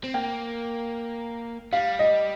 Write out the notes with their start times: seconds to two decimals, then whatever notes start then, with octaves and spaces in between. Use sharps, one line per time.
0.04 C4
0.14 A#3 G5
1.73 G3 F5
1.99 D#5